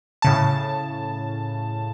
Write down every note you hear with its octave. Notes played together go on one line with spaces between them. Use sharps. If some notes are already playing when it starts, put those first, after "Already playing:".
A2 C#3 A5